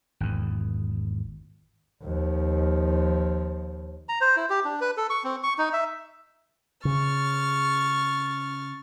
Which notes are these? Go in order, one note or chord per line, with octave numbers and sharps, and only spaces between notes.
G#1 E2
D#2 F3
A#5
C5
E4
G4
D4
B4
A4
C#6
C4
C#6
D#4
E5
C#3 C#6 F6 A6